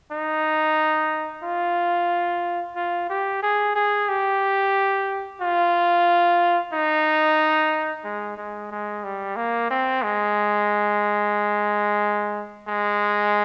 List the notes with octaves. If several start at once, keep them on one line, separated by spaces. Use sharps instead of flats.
D#4
F4
F4
G4
G#4
G#4
G4
F4
D#4
G#3
G#3
G#3
G3
A#3
C4
G#3
G#3